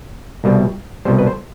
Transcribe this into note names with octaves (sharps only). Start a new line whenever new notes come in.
C2 B2 G3
C2 B2 G3 C5
B4
C5